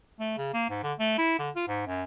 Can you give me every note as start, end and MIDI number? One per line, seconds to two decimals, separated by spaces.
0.20 0.36 57
0.38 0.53 49
0.54 0.68 58
0.70 0.79 44
0.83 0.93 50
0.99 1.17 57
1.18 1.38 64
1.39 1.50 50
1.56 1.64 65
1.68 1.82 44
1.87 2.03 42